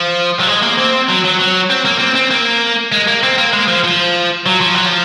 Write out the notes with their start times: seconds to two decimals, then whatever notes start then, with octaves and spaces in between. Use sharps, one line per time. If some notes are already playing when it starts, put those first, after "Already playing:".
Already playing: F3
0.40 F#3
0.47 G#3
0.62 A#3
0.78 C4
1.09 F#3
1.24 F#3
1.38 F#3
1.70 C4
1.85 A#3
2.00 C4
2.16 C4
2.31 A#3
2.92 G#3
3.08 A#3
3.23 C4
3.38 A#3
3.53 G#3
3.68 F3
3.84 F3
4.46 F#3
4.61 F3
4.74 F#3
4.86 F3